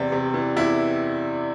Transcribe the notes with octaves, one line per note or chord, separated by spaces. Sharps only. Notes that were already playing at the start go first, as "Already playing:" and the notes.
Already playing: E2 C3 D5
C3
E3
E2 E4